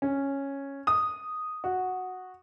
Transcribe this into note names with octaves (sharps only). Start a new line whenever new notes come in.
C#4
D#6
F#4